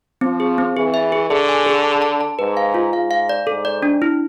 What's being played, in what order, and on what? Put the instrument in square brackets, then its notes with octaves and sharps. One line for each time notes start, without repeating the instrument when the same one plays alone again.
[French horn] F3 [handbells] C4
[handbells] G#4
C4
[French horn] E3 [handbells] G#4
[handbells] E5
G#4
[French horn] D3 [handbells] G#4
[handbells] G#5
G#4
A5
A5
A5
[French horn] G#2 [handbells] B4
[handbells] F5
F4
[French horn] G#2 [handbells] F5
[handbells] F5
D5
[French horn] G#2 [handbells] A4
[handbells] D5
D4
E4